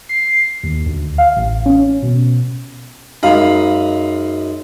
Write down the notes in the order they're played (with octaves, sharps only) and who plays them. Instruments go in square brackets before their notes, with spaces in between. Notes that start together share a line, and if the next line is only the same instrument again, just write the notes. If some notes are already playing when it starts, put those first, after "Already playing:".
[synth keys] C7
D#2
D2
F5
A1
C#4
B2
[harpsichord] F#2 G#3 B5 [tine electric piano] D#4 [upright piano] F5